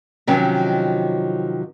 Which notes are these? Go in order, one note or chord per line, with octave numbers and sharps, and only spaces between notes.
C3 D#3 F3 F#3 C#4